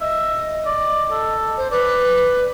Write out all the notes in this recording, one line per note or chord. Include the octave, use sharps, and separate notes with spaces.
D#5 E5
D5
A4
C5
B4 D5